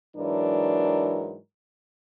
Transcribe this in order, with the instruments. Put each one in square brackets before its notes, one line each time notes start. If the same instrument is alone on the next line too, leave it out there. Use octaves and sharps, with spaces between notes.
[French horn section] G#2 E3 F#3 D4 A#4